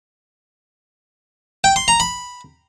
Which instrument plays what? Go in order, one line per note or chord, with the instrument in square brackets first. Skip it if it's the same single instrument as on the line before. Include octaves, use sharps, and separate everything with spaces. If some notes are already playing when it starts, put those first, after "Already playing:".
[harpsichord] G5
C6
A#5
B5